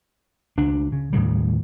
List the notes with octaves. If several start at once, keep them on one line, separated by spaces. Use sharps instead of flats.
C#2 D4
C#3
D#2 A2 C#3 G3